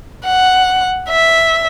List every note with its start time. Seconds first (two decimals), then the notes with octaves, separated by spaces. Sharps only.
0.25 F#5
1.09 E5